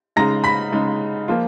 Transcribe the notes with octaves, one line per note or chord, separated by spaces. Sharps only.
C#3 G#3 D#4 A#5 A#6
B5 B6
C#3 G#3 D#4
F3 A#3 F4